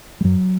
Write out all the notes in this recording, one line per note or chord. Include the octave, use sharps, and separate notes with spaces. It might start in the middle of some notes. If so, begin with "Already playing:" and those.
G3
F#2 F#3